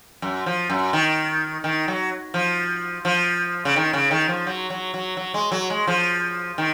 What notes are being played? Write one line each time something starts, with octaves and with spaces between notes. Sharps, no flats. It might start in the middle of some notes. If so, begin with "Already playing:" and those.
F#2
F3
F#2
D#3
D#3
F#3
F3
F3
C#3
D#3
C#3
D#3
F3
F#3
F#3
F#3
F#3
G#3
F#3
G#3
F3
D#3